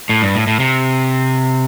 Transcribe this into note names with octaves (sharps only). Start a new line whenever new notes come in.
A2
G2
A2
A2
C3